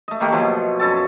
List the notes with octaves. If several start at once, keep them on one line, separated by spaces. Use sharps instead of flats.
A3 D#5
D#3 A3 A#3 G4
B2 F3 F#3
F#2 A4 A5